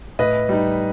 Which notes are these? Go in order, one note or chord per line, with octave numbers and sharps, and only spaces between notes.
A2 B4 D#5
G3 D#4